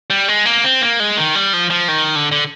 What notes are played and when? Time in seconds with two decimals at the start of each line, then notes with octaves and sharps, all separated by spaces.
0.10 G3
0.28 G#3
0.45 A#3
0.64 C4
0.82 A#3
1.00 G#3
1.17 D#3
1.35 G3
1.53 F3
1.70 F3
1.88 D#3
2.15 D3
2.32 D3